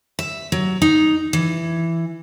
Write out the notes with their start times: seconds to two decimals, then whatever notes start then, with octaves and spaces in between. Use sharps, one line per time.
0.19 E5
0.52 F#3
0.82 D#4
1.33 E3